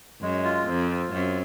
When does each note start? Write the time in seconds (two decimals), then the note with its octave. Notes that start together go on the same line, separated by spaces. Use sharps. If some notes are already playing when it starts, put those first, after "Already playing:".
0.21 F#2 G#3
0.45 F4
0.67 F2 C4
0.91 F4
1.13 F#2 C4